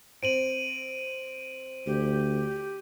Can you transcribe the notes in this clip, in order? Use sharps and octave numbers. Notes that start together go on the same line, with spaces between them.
C4 D7 D#7 F#7
D2 G4